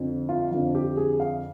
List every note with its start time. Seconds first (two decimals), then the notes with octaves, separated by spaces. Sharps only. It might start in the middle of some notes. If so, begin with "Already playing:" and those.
Already playing: F2 D3 F3
0.29 F4
0.51 F2 D3 F3 F4
0.75 G4
0.97 G#4
1.20 F5